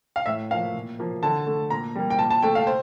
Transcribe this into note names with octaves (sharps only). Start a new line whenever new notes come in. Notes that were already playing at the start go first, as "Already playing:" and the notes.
F5
A2 E5
F3 A#3 F5
A#2
F3 A#3
D3 A5
A3
A#2 A#5
G3 A#3
G5
A#2 A5
A5
A3 G5
F5
C5